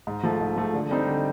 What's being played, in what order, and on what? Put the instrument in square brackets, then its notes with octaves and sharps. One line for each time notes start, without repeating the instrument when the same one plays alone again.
[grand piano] G#2
F3 A3
G#2
F3 A3
D3
G3 C4 D#4
D3